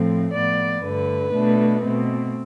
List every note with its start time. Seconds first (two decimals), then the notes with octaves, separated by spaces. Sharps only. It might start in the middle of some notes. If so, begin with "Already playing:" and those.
Already playing: A2 F3 A3 C4
0.34 A2 F3 B3 D5
0.84 G2 D3 A3 B4
1.34 B2 A3 D4
1.83 B2 A3 C4